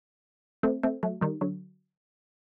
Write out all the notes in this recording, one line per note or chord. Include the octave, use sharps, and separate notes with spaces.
A3 C4
A3 C4
F#3 A3
D#3 G3
D3 F#3